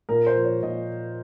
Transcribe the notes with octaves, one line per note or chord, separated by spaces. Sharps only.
A#2 A#4
C5
F3
C#5
A#2 D#5